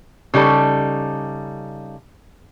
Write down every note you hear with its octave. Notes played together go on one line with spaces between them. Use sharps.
C#3 G3 D#4 A4